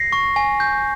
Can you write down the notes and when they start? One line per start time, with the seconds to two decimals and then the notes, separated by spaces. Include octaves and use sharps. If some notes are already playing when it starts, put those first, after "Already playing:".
Already playing: A#6 C7
0.12 C#6
0.36 G#5
0.60 G6